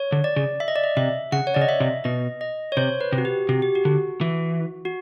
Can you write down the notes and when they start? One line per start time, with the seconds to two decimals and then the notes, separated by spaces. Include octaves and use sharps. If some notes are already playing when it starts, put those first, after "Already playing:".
Already playing: C#5
0.12 D3
0.24 D5
0.36 C#3
0.60 E5
0.68 D#5
0.76 D5
0.84 D#5
0.97 C3 E5
1.32 C#3 F#5
1.47 C#5
1.54 C#3 D5
1.62 D#5
1.69 E5
1.80 C3
2.04 B2 D#5
2.41 D#5
2.72 C#5
2.77 C3 C5
3.01 B4
3.12 C3
3.18 F#4
3.25 G4
3.49 C3 F#4
3.62 G4
3.75 F#4
3.85 D3
4.21 E3
4.85 F#4